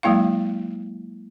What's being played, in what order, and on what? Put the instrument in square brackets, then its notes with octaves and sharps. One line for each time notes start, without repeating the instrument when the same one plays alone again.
[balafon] F#3 G#3 A#3 E4 F5